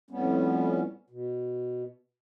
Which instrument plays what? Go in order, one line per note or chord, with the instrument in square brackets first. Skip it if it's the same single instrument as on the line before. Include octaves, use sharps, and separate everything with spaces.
[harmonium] F2 A2 G3 B3 C#4
B2